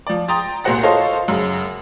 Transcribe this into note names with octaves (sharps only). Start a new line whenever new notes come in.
F3 D5
G5 A#5 C6 D#6 A6
C2 A#2 F#4 C5 F#5 A#6
F4 A4 C5 C#5 D#5 F5
F#2 C#3